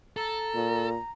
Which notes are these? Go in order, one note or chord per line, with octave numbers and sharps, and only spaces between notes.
A4 A#5
A#2